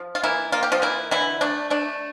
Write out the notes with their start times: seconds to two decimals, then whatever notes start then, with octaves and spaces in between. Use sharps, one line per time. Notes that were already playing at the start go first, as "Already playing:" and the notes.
Already playing: F3
0.15 F4
0.23 E3 A#3 E4
0.52 A#3 F4
0.63 G4
0.72 F3 F4
0.82 E3 A#3 E4
1.11 D3 E3 E4
1.41 A3 D4
1.70 A3 D4